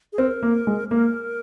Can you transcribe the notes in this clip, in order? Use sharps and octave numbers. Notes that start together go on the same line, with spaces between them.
G#4
C4 A#4
A#3
G#3
A#3 A#4